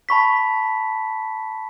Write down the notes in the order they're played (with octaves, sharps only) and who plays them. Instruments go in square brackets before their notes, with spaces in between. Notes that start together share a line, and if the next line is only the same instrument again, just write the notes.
[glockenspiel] A5 B5 C#6 B6